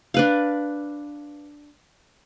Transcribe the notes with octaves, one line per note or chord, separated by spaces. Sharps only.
D4 B4 F5